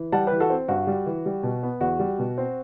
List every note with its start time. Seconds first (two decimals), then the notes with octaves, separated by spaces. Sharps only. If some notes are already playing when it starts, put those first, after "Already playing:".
Already playing: E3
0.12 G3 F#5 A5
0.27 E3 G4 B4
0.40 F#4 A4
0.50 C4
0.68 G2 F#4
0.87 G3
1.06 E3
1.26 G3
1.43 B2
1.63 B3
1.81 E2 F#4
1.99 G3
2.19 B2
2.38 C4